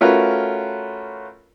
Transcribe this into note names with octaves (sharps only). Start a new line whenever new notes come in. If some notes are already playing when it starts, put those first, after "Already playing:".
A3 C#4 F4 F#4 A#4 B4